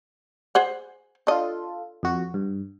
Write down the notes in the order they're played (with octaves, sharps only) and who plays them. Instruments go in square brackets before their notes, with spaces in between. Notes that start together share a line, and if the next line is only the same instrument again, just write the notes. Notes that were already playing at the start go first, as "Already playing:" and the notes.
[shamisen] G#4 C5 F#5
[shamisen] D4 D#5 [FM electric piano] F4 A4
[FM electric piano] F2 F#4
G2